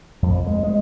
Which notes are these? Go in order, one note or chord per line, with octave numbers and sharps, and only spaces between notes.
F2
G#3
G#3